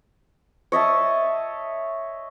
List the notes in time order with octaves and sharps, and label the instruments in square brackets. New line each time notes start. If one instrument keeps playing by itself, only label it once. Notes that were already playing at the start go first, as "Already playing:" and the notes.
[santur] C#5 D#5 E5 A5